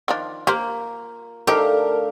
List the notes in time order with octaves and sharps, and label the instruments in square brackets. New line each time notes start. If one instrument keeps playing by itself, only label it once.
[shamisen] D#3 F3 D4 [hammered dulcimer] F4
[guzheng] A#3 [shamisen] G4 A#4 C5
[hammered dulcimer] D3 A3 [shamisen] D#4 C5 [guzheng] G4 [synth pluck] A4 A#4 F5